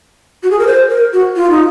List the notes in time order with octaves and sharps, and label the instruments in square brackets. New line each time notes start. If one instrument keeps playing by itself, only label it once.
[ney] F#4
G#4
A#4
C5
A#4
F#4
F4
D#4